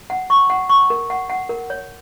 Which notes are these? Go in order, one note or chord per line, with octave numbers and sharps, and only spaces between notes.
F#5
C#6
F#5
C#6
A#4
F#5
F#5
A#4
C#5